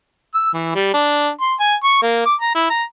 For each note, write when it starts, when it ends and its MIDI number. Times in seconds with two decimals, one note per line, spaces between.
0.34 0.53 88
0.53 0.72 52
0.75 0.89 55
0.94 1.30 62
1.41 1.54 84
1.60 1.74 80
1.84 2.00 85
2.02 2.23 58
2.26 2.35 86
2.41 2.55 82
2.55 2.66 64
2.70 2.83 82